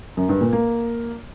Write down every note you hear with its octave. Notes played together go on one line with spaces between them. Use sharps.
F#2
G2
A#2
A#3